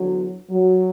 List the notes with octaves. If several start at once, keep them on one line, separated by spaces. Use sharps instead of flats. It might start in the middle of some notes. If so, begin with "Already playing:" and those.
Already playing: E2 D3 F#3
F#3